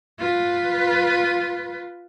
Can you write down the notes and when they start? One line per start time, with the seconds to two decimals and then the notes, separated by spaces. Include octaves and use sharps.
0.19 F4 B4